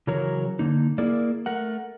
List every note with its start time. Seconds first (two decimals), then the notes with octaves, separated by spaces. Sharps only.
0.07 C#3 E3 F#3 A#4 C#5
0.59 D3 A#3 D#4
0.98 A#3 E4 G#4 A#4 D5
1.46 A3 A#4 F#5